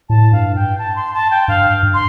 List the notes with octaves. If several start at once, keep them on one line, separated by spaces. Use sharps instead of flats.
A2 A5
G2 F5
G5
A5
C6
A5
G5
G2 F5
G2
C6